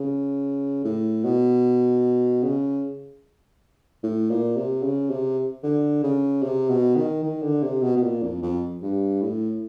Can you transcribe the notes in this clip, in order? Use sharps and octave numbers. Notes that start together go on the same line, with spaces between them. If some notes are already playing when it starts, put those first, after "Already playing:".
Already playing: C#3
A2
B2
C#3
A2
A#2
C3
C#3
C3
D3
C#3
C3
B2
D#3
D#3
D3
C3
B2
B2
A#2
F2
F2
G2
A2